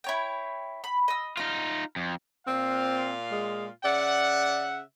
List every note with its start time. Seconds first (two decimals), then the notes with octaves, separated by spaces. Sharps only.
0.04 E4 C#5 G5
0.84 B5
1.08 D#5 E6
1.37 D#4 F4 F6
1.96 F2
2.47 A#2 C4 F4 F5
3.32 G#3
3.85 C#3 D5 E5 F#5